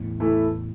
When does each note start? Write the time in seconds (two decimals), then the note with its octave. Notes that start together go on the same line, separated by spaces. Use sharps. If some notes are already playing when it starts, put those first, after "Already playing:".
Already playing: E2 A2
0.20 E3 A3 E4